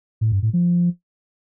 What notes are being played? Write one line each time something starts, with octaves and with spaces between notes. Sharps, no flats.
A2
G2
A2
F3